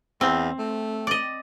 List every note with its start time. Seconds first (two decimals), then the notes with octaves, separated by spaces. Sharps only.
0.21 E2 C4
0.59 A3
1.07 D5 D#5